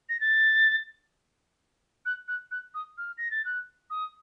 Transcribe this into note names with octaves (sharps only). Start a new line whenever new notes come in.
A#6
A6
F#6
F#6
F#6
D#6
F6
A#6
A6
F#6
D#6